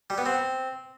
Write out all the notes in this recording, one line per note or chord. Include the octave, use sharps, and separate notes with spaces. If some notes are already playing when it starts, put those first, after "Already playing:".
G3
B3
C4